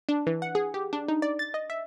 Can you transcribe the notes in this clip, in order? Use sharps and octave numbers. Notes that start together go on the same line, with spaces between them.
D4
E3
F#5
G#4
G4
D4
D#4
D5
A6
D#5
E5